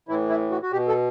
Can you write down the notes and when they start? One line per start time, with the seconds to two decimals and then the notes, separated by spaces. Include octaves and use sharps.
0.08 A2 E3 E4
0.29 E4
0.51 F#4
0.62 F#4
0.72 B2 G4
0.88 A4